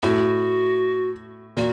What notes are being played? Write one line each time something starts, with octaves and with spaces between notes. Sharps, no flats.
A2 F#4
A#2 F#4